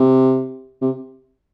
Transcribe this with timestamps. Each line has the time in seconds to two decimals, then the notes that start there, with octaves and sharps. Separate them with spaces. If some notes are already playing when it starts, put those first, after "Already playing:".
Already playing: C3
0.82 C3